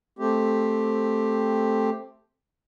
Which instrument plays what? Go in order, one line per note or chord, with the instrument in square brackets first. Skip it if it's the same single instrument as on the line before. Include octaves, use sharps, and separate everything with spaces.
[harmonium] A3 C4 G4